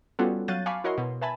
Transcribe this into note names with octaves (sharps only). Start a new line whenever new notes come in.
G3 B3 C#4 F4 F#4 A4
F#3 F5 F#6 G6 A6 D#7
F5 G#5 A5 B5 C#6 D6
E4 F#4 A#4 C#5 D#5 C6
B2
B4 E5 G#5 A5 B5